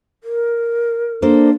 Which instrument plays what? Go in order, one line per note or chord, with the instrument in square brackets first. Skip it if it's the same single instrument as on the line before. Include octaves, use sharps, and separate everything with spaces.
[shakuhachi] A#4
[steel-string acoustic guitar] A#3 A4 C5 [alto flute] D4